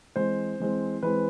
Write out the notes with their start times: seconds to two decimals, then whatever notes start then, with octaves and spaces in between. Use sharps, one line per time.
0.16 E3 G#3 C4 C5
0.60 E3 G#3 C4
1.03 E3 G#3 C4 B4